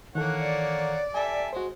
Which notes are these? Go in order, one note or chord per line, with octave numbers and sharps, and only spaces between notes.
D#3 E3 A#3 A4 C#5 F#5 F#6
D5
G3 A4 E5 G#5
G#3 F#4 C5